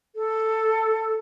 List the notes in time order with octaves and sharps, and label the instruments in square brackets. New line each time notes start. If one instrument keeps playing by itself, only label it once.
[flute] A4